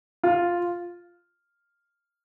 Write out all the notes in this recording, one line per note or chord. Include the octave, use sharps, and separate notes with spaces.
F4